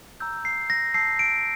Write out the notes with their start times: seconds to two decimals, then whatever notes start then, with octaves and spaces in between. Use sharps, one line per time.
0.20 A#5 E6 G6
0.45 C7
0.70 A#6
0.94 A5 E6 G6 C7
1.19 D7